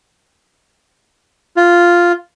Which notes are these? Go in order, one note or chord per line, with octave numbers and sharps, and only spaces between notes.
F4